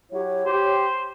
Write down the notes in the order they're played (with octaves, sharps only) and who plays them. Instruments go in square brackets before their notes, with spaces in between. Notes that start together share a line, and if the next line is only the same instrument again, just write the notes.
[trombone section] F#3 E4 G4 [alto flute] C#5
[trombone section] G4 [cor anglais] C5